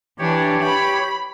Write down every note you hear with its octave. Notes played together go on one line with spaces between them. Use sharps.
E3 D4 G4 C#5
B5